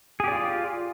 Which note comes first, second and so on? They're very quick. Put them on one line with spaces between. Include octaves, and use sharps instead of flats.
G#4 G4 D5 F4